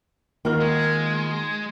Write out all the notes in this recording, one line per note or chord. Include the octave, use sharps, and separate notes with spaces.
D#3 A#3 F4 F#4 F6
G#3